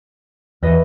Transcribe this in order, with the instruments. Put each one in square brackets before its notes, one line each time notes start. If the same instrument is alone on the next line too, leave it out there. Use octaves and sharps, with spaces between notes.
[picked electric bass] E2 [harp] B4 D#5 E5